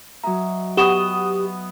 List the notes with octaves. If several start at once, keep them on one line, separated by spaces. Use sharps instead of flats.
F#3 D#5 E5 A#5
B3 G4 C#6 D#6 E7 G7